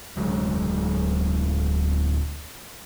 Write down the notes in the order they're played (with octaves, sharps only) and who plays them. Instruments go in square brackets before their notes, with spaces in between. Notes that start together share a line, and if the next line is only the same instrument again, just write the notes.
[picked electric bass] D1 D2 F#3 G#3